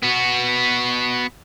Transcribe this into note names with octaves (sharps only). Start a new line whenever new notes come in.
B3 F#4